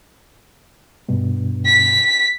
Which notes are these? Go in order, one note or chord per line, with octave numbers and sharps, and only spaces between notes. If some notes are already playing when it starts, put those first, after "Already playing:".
G2 B2
B6